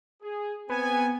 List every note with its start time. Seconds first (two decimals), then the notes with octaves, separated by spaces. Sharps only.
0.22 G#4
0.69 B3 C4 G#5